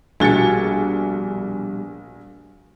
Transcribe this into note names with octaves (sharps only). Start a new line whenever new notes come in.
A#1 B2 G3 F#4 G#4 A6 C#7